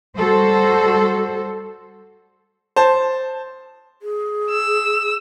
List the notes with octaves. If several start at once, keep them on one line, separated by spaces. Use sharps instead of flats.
G3 F#4 A4 C5
C5 A5
G#4
E6